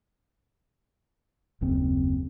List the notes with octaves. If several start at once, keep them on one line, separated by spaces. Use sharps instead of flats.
F#1 D#2 C#3 C4